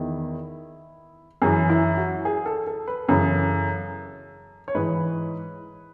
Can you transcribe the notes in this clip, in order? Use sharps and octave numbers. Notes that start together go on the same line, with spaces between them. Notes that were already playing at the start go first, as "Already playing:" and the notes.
Already playing: E2 D#3 E4
F#2 E3 G#4
E4
F#4
G#4
A4
A4
B4
F#2 C#3 E3 A4
C#5
G#2 E3 B4